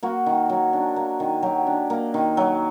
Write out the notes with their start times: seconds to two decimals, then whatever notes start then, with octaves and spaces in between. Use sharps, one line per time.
0.03 A#3 F#4
0.26 D#3
0.49 F#3
0.73 D4
0.96 A#3
1.20 D#3
1.43 F#3 G4
1.67 D4
1.90 A#3
2.14 D#3
2.37 F#3